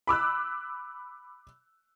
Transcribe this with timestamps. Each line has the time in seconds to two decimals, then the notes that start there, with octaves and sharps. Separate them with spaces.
0.07 B5 D6 E6 F#6